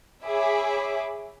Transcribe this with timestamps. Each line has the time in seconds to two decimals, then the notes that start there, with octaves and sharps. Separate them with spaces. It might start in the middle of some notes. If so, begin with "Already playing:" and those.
0.24 G#4 C#5 E5 B5 D6